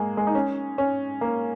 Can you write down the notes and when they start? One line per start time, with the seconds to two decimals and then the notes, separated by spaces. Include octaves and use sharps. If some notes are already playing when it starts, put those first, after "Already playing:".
Already playing: G#3 A#3
0.17 G#3
0.27 D#4
0.35 C#4
0.78 C#4
1.21 A#3